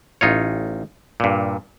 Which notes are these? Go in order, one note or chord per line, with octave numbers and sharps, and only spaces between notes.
A1 D#4 F4 C#5
G2 A#2